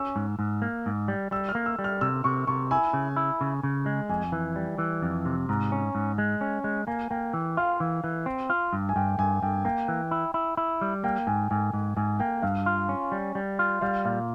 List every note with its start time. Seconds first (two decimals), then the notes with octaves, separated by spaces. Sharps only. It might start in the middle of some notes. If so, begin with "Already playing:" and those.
Already playing: C#4 E6
0.16 G#2
0.39 G#2
0.62 A#3
0.86 G#2
1.08 G3
1.31 G3 E6
1.49 F6
1.55 A#3
1.66 E6
1.79 G3
1.84 F6
2.01 C3 E6
2.24 C3 C#6
2.47 C3 C#6
2.71 E4 G#5
2.93 C#3
3.16 E4
3.41 C#3
3.63 C#3
3.86 G#3
4.09 F2 G#5
4.32 E3
4.56 G3
4.78 E3
5.02 F2
5.25 C3
5.49 G#2 A#5
5.72 C#4
5.95 G#2
6.18 G#3
6.41 C#4
6.64 G#3
6.87 A#3 G#5
7.10 A#3 G5
7.34 E3
7.57 F4 F5
7.80 E3
8.04 E3
8.26 C4
8.50 F4
8.73 G2
8.89 G#5
8.96 G2 G5
9.19 G2 G#5
9.42 G2 G5
9.65 A#3 G5
9.88 E3
10.11 E4
10.34 E4
10.57 E4
10.81 G3
11.04 A#3 G5
11.27 G#2 G#5
11.51 G#2 G#5
11.73 G#2
11.97 G#2 G#5
12.20 A#3 G5
12.42 G2 F5
12.66 F4
12.89 C#4
13.12 G3
13.35 G3
13.59 F4
13.81 G3 F5
14.05 A#2 F5